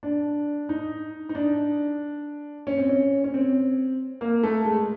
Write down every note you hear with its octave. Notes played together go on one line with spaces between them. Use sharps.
D4
D#4
D#4
D4
C#4
C4
C#4
C#4
C4
A#3
A3
G#3